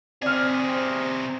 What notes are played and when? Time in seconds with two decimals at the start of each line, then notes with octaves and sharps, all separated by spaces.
0.22 C3 C4 G#4 D5 F6